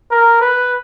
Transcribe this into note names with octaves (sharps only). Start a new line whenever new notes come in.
A#4
B4